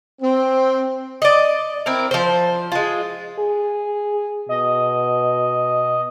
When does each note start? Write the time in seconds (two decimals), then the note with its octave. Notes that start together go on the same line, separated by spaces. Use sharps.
0.21 C4
1.22 D5 D#5
1.86 C4 E4 A#4
2.11 F3 C5
2.72 G#3 F4
3.39 G#4
4.49 B2 D#5